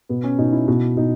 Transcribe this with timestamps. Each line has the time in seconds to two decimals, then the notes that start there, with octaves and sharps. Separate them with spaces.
0.09 B2 B3
0.24 C#4
0.39 B2 D#4
0.53 E4
0.68 B2
0.97 B2 D#4